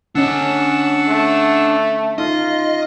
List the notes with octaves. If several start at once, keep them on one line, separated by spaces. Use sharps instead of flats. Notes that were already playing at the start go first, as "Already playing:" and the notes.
D3 C#4 D4 D#5 F#5 A5 E6
A3
D#4 F4 D#5